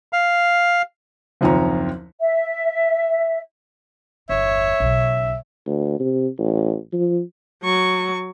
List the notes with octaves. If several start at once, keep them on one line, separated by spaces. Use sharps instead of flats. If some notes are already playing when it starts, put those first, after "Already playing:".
F5
F#1 D#2 F3 C4 C#5 A#5
E5
G1 E2 C#5 E5
B1 C#3
D2
C3
A1
F3
F#3 C#6